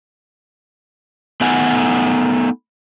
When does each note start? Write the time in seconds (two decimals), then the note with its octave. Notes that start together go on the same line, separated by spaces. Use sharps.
1.41 A3 B3 D#4 F#5 G#5